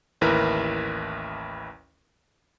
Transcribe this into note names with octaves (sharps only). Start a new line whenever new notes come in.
A1 D#2 E4 A#4 B4 E5